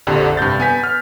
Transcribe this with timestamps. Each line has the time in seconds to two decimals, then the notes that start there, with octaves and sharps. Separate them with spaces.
0.07 A#1 F2 D3 G4
0.37 G2 C3 G6 A6
0.60 B3 G#5 B6
0.84 F6